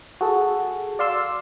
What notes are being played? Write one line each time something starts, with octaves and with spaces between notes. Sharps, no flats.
F#4 G#4 A4
D5 F5 C6 E6